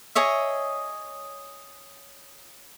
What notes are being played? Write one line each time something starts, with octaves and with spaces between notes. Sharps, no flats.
G#4 C#5 D#5 E5